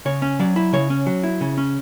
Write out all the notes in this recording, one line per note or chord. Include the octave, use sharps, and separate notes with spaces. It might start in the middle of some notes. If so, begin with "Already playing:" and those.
C#3 C#5
C#4
F#3 D5
E4
C#3 C#5
C#4
F#3
E4
C#3
C#4